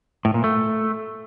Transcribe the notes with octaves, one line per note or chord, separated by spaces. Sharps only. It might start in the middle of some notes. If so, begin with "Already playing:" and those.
A2
A#2
A3